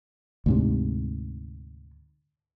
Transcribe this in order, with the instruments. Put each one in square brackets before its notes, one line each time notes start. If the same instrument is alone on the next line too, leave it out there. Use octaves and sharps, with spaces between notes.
[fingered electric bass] D2 G#2 C3